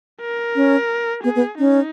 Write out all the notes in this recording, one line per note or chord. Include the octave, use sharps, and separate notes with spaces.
A#4
C#4
B3 G#4
B3
C#4 D#4